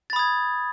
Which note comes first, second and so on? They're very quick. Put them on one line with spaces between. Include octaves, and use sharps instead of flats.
A6 B5 D#6 G#6